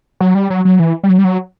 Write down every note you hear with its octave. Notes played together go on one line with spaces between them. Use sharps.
F#3
G3
F#3
F#3
E3
G3
F#3
G3
F#3